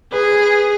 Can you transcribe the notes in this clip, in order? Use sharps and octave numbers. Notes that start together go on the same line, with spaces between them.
G#4 B4
B4